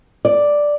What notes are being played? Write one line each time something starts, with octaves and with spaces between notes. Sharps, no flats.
D5